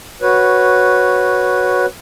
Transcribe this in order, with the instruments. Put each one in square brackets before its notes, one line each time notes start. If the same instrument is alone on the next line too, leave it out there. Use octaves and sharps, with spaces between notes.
[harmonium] F#4 B4 C#5